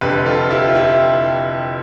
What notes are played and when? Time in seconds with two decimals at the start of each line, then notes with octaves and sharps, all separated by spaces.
0.01 F1 F2 D3 G4 B4
0.26 F4 A4
0.50 E4 G4
0.68 F4
0.75 E4 G4